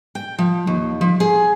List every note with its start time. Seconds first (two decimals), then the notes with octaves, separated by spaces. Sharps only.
0.15 G5
0.39 F3
0.67 D#2
1.01 F3
1.20 G#4